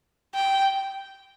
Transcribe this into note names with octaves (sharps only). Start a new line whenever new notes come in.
G5